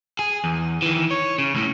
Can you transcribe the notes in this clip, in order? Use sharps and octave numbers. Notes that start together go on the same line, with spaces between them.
G#4
E2
D#3 E3
C#5
C#3
C#2 A2